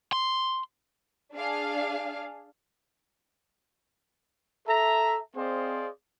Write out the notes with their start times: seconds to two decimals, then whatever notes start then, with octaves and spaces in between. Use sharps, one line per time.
0.13 C6
1.35 D4 G#4 F5
4.68 A4 E5 A#5
5.36 C4 G#4 C5 D5 D#5 F5